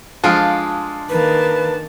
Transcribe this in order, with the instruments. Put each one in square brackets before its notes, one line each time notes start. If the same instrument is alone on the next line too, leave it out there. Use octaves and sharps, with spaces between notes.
[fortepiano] F3 G#3 [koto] D4 F4 F5
[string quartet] D#3 A#3 A5 [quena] B4